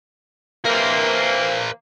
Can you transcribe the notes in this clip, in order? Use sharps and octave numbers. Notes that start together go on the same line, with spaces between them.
C3 E3 A#3 A#4 C5